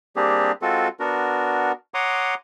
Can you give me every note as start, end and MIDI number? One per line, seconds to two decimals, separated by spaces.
0.16 0.52 55
0.16 0.52 58
0.16 0.52 60
0.16 0.52 62
0.16 0.52 67
0.16 0.52 68
0.62 0.88 56
0.62 0.88 60
0.62 0.88 65
0.62 0.88 66
0.62 0.88 69
1.00 1.72 59
1.00 1.72 62
1.00 1.72 66
1.00 1.72 70
1.94 2.34 73
1.94 2.34 78
1.94 2.34 82
1.94 2.34 84
1.94 2.34 86
1.94 2.34 87